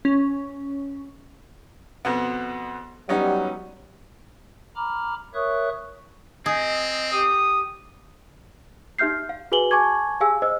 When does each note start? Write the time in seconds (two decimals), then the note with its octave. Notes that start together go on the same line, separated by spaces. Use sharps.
0.05 C#4
2.05 F2 B2 B3
3.09 F#3 G3 B3 C#4 D#4
4.76 A#5 B5 D6 F6
5.34 A#4 C#5 E5 C#6 D#6 F#6
6.46 C4 G#4 D#5
7.12 G4 D#6
8.99 D#4 G4 E5 F6 G6 C7
9.29 F5
9.52 F#4 G#4 B4 G#5 F#7 G7
9.71 G#5 A5 C#6 D6 G#6
10.20 G4 G#4 F5 G#5 E6
10.42 C5 D#5 E6